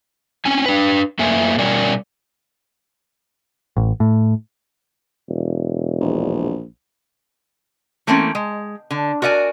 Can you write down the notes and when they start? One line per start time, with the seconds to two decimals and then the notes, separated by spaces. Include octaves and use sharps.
0.45 C4 C#4 G#5
0.66 D4 B4
1.19 F#2 A3 A#3 B4 E5 G#5
1.58 B2 G3 C#4 A#4 D5 G#5
3.77 A1
4.00 A2
5.29 E1
6.00 A#1
8.07 E3 A3 A#3 C4 C#4
8.35 G#3
8.91 D3
9.22 F#4 A#4 D5 D#5 G#5